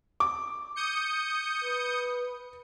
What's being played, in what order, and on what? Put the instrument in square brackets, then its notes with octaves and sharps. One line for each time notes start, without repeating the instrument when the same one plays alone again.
[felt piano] D6
[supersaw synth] D#6 G6 C#7
[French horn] B4